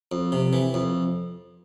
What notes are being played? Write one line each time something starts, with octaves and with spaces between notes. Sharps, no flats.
F2
C3
E3
F2